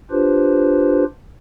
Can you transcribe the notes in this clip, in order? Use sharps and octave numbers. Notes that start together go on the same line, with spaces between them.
D4 F4 G4 B4 C5